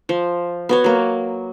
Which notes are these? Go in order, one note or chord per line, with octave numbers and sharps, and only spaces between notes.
F3
B3 F#4 C#5
F#3 A#3